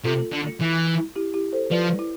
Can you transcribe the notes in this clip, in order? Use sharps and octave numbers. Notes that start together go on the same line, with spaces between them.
C3 F4 A4
D3
E3
E4 G4
E4 G4
A4 C5
F3 B4 D5
E4